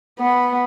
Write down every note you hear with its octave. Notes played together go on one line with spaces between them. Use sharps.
B3